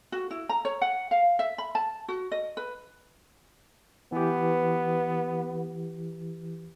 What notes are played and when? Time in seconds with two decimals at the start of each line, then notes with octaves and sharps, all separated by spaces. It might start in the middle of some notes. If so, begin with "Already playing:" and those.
0.12 F#4
0.31 E4
0.49 A#5
0.65 C#5
0.81 F#5
1.11 F5
1.39 E5
1.58 B5
1.75 A5
2.08 F#4
2.32 D#5
2.57 B4
4.12 E3 B3 G4